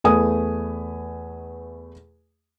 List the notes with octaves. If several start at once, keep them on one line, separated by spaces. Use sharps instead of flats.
E2 A3 B4 G#5 D#6